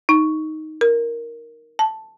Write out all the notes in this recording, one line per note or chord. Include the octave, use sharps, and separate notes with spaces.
D#4
A#4
A5